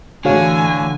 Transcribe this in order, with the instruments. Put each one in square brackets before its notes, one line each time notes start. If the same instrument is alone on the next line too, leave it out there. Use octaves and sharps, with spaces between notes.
[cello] A2 E3 [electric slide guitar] D3 [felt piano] F#4 C#5 F5 [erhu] G#5